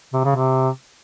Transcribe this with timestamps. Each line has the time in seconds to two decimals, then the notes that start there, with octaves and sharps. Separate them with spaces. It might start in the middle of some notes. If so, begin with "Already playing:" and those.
0.13 C3
0.24 C#3
0.35 C3